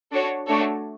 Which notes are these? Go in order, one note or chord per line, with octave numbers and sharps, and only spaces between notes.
D4 F#4 A4 C#5
A3 D4 F#4 A4 C#5